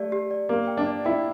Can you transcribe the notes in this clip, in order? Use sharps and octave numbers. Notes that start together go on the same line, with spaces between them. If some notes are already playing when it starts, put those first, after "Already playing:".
Already playing: A3 G4 D5
G4
D5
A#3 G4
G5
D4
D5
E4 G5